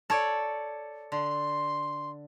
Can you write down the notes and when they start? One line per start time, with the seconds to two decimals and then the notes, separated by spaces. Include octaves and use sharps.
0.10 A4 C#5 D5
1.12 D3 C6